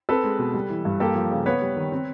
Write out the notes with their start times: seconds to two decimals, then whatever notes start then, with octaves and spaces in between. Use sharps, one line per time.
0.09 C4 A4 B4
0.24 G#3
0.39 B2
0.54 G3
0.70 E3
0.85 G2
1.00 A#3 G4 A4
1.15 F3
1.31 C#3
1.46 B3 B4 C#5
1.62 G3
1.76 D#3
1.92 C4